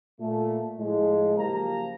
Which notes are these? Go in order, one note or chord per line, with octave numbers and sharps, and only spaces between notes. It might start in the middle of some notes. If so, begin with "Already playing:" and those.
A#2 A3
A2 F3 G#3
F#1 F3 A#3 G4 A#5